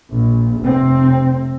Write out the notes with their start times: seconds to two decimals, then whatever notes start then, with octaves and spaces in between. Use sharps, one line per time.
0.12 A#1
0.62 F1 C3 C4